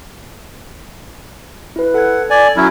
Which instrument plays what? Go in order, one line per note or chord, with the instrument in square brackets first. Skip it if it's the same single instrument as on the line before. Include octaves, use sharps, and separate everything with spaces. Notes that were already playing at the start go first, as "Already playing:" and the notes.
[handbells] E4 B4
[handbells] A4 G#6 [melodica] F#5
[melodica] D5 G#5
F#3 C#4 E4